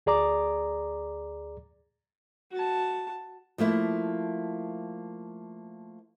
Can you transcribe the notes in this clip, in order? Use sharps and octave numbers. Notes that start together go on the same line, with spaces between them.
D2 G#4 D5 A#5 D6
F#4 A5
F3 A3 A#3 E4